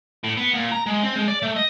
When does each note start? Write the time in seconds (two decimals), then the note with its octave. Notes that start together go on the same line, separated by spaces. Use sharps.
0.24 A2
0.37 B3
0.54 A#2
0.72 A#5
0.87 G#3
1.04 C4
1.16 G#3
1.28 D5
1.42 A3
1.56 D#5